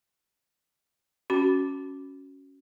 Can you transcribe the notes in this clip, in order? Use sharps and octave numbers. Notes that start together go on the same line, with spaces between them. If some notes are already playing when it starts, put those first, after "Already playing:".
C#4 F#4 B5